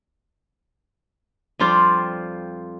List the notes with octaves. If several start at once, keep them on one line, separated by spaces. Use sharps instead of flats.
F2 G3 F4 C5 D5